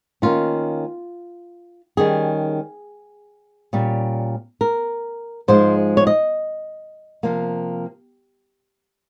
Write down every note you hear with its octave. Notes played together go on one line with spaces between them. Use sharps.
D#3 A#3 C#4 F4
D#3 G3 C#4 G#4
A#2 G3 C#4
A#4
G#2 F3 G#3 C5
C#5
D#5
C3 F3 A#3